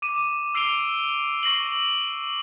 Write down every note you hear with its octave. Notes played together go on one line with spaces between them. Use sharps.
D6 D#7 E7
E6 C7 D7 F7 G7
C#6 A#6 C7 F#7